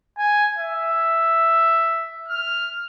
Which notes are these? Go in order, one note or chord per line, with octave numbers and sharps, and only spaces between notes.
G#5
E5
F6